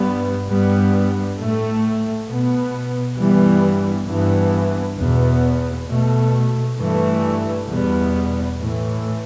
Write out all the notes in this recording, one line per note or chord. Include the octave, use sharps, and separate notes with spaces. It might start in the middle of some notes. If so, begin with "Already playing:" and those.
Already playing: G2 G3 B3
G2 G3 B3
A2 A3
B2 B3
G2 E3 G3 B3
G2 E3 B3
E2 B2 B3
B2 A3
G2 E3 A3
E2 B2 G3 B3
A2 E3 A3